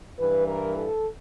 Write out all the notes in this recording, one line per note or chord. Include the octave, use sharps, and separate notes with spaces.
G2 E3 B4
A#4
A4